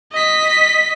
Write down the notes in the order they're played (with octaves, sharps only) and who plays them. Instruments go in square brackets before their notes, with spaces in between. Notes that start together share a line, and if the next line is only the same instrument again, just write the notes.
[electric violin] D#5 B6